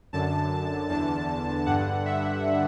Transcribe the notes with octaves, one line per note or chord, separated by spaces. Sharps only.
F#2 D3 A5
E2 D3 A5
G2 D3 F#5
E5